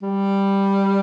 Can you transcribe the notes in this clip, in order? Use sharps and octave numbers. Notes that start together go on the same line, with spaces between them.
G3